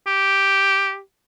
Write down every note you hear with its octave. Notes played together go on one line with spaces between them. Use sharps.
G4